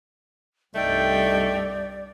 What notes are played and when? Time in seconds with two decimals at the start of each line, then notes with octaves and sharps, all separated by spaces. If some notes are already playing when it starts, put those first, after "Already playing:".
0.75 C2 G2 A3 D#4 A4 D5 G5